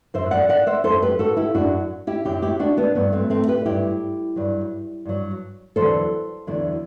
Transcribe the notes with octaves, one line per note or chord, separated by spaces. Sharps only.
F#2 F#3 C5 E5
D5 F#5
D5 F#5
C5 E5
F#2 F#3 A4 C5
G4 B4
F#4 A4
E4 G4
F#2 F#3 D4 F#4
E4 G4
F#2 F#3 E4 G4
E4 G4
D4 F#4
B3 D4
G2 F#3 B3
A3 C4
A3 C4
G4 B4
G2 F#3 E4 G4
G2 F#3
G2 F#3
E2 D3 F#3 A4 C5
E2 D3 F#3